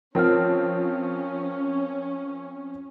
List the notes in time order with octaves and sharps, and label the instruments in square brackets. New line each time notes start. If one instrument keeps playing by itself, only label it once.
[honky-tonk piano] F3 C4 F4 [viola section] C#4 [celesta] A#4 F6 [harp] C#5